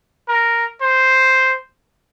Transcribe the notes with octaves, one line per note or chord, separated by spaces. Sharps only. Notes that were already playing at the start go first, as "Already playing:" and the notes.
A#4
C5